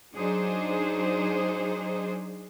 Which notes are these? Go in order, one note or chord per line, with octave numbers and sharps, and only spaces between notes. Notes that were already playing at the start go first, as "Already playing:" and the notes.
F#3 D4 D#4 G#4 C5